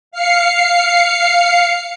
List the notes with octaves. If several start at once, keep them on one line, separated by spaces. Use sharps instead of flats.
F5 C7 C#7